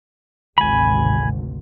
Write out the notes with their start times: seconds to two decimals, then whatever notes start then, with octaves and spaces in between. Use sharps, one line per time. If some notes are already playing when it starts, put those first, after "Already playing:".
0.58 G#1 D2 C3 G#5 B5